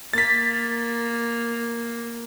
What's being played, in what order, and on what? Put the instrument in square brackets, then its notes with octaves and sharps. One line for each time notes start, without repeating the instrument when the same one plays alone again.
[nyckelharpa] A#3 [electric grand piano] A6 B6